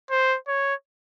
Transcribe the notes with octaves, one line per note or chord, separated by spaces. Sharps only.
C5
C#5